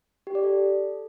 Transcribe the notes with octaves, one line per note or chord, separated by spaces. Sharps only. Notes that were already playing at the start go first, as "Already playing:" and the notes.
G4
D5
A4